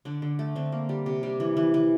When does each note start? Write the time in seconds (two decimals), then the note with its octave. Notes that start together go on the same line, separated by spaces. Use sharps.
0.05 D3 D4
0.22 D3
0.39 A3
0.56 D3 C4
0.72 A#3
0.89 G3
1.06 C3
1.23 G3
1.40 E3
1.57 E3
1.74 E3